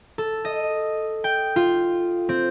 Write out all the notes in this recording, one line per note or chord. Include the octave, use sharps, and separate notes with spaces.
A4
D#5
G5
F4
C4